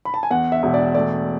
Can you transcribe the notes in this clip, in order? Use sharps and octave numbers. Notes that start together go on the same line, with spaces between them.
B5
A5
G#5
E2 F#5
E5
E1
D5
A3 D5